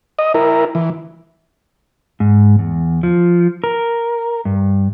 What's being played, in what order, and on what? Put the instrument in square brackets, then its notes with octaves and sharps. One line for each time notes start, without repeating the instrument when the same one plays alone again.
[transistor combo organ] D#5
E4 A#4
E3
[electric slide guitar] G#2
E2
F3
A#4
G2